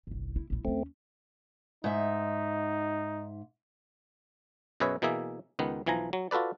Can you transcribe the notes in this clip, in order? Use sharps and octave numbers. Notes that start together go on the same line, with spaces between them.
G1 C2
E4
A#1 E4
D#2 A3 C4 C#4
G#2 D#4 E5
F#2 B2 G#4 B4 C#5 E5
B2 E3 A#3 G#4 E5
C#2 D#3 B3
B1 E3 F3 G#5 A#5
F#3
F4 F#4 A4 B4 D5